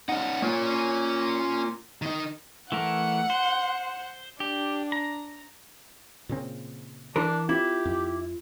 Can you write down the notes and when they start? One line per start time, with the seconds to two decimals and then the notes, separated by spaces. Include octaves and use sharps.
0.09 C#4 D#4 F#5
0.42 A#3 C#4 F4 C#5
2.02 D#3 D#4
2.72 E3 A3 A#4 F#5
3.30 C5
4.40 D4 G4
4.92 A#5
6.29 A#2 C#3 C4
7.16 E3 D4 A#4
7.49 C4 E4 F4 G4
7.85 F2